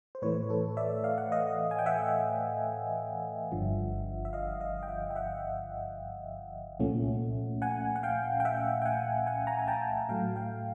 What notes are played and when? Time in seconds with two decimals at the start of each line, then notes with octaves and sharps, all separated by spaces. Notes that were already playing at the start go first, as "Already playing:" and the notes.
0.15 C5
0.22 A2 E3 A3 B4 C#5
0.49 A4 B4
0.77 D5 E5
1.04 F5
1.18 F#5
1.32 D#5 F5
1.71 G#5
1.79 G5
1.86 E5 F#5
3.52 G1 G2 D3 F3
4.25 E5
4.33 D#5 F5
4.60 D#5 F5
4.83 G5
4.88 E5 F#5
5.11 G5
5.16 E5 F#5
6.80 C2 A#2 F3 A3 C#4
7.62 F#5 G#5
7.96 F#5
8.03 F5 G5
8.40 G5
8.45 E5 F#5
8.82 G5
8.85 F#5 G#5
9.26 F#5 G#5
9.47 G#5 A#5
9.59 G#5
9.68 G5 A5
10.09 A2 F#3 A3 F5 G5
10.36 F5 G5